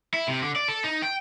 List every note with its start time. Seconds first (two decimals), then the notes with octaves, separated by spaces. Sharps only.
0.14 E4
0.28 C3
0.42 D3
0.56 D5
0.68 A4
0.84 D#4
1.02 G5